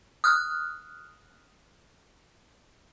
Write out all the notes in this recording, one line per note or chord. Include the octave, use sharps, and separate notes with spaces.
D#6 F6 F#6